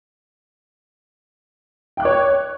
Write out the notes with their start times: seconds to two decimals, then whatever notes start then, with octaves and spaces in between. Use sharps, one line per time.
1.97 G5
2.00 F#6
2.03 D6
2.05 C#5
2.08 C#6